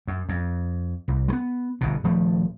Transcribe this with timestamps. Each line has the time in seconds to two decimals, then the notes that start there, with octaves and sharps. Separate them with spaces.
0.08 F#2
0.29 F2
1.08 C2
1.28 G3 B3
1.81 G1 G2 B2
2.04 D#1 F3 A3